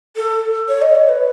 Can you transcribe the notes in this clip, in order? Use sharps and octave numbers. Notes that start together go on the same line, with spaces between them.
A4
C#5
D#5
C#5
B4